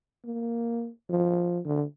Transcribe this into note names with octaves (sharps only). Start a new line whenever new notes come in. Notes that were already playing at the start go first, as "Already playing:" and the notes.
A#3
F3
D3